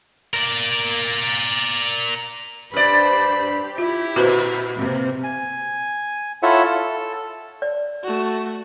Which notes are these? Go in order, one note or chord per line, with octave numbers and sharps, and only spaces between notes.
A#4 D5
G2 D4 G4 C5 D5 B5
G4
E4 F4
A#2 F#4 B4 C5
C3 A#3
G#5
E4 F4 A4 C#5 E5 F#5
A4
D5
A3 F#4